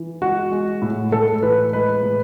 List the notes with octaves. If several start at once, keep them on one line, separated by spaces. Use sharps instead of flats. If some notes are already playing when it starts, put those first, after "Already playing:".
Already playing: E3
G#3 F#4
G#3
A2
A2 A4
E3 B4
G#3 B4
A2